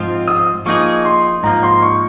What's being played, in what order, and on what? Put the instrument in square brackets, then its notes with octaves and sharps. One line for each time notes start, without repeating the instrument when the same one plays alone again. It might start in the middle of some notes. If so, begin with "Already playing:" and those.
Already playing: [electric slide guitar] G#2 F3 C4 F4
[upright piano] D#6
[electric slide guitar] F3 A#3 D#4 G#4 [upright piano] C#6
[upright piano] C6
[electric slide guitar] G#2 F3 A#3 [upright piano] A#5
[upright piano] C6
C#6